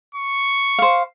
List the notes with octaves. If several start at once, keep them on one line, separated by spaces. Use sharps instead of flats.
C#6
C5 F5